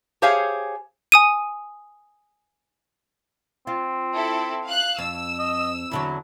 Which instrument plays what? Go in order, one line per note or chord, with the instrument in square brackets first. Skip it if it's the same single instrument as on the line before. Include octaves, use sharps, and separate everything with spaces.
[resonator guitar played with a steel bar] G4 G#4 C5 C#5 F5 G#5
[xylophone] G#5 D#6 D#7
[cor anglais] C4 [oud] F4
[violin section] E4 A4
F5 F#6
[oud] F2 [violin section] E6
[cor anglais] D#5
[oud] E2 D3 F#3 [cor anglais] E4